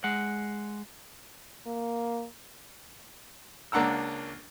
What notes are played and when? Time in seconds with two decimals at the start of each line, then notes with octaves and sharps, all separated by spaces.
0.04 G#3 F#5
1.66 A#3
3.72 C#2 A#3 D4 F#5 A#5 E6